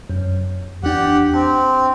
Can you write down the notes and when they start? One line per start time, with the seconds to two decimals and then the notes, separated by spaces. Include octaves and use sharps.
0.10 F#2
0.84 E2 D4 G4 F#5
1.34 C4 A5 D6